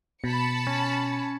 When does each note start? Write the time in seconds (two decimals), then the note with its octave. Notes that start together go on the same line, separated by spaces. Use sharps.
0.24 B2 A5 B5 C#7
0.67 C#4